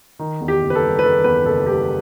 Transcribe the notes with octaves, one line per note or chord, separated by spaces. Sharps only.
D#3
E2
G4
F#1
B4
A4
G3
B4
D#3 A4
E2 B4
F#1 A4
G3 G4